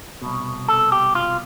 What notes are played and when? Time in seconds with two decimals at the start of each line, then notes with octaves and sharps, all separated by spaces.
0.22 C2 B2
0.68 A4
0.92 G4
1.15 F4